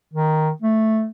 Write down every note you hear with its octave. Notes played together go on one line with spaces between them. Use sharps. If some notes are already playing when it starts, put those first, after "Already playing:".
D#3
A3